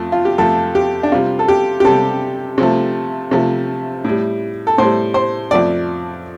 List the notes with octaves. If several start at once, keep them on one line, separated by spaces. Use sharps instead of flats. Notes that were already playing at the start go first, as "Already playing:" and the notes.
Already playing: F2 A3
F4
G4
F2 F3 A3 A4
G4
D4
C3 G3 F4
A4
G4
G4
C3 G3 A4
C3 F3 A3
C3 F3 A3
A2 G3
A4
A2 G3 C5
C5
F2 F3 A3 D5